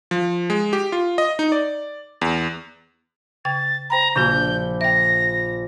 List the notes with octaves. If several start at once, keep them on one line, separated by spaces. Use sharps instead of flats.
F3
G#3
G4
F4
D#5
D#4
D5
E2
C#3 G5 G#6 A6
C5 G5 A#5 B5
A#1 C#3 A#3 F#4 G6
E5 G5 A#6